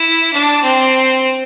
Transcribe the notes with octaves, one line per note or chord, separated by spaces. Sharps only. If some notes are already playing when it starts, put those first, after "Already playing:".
Already playing: E4
D4
C4